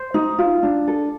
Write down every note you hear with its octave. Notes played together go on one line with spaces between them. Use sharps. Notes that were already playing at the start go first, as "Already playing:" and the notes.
Already playing: C5
D#4
F4
D4
A4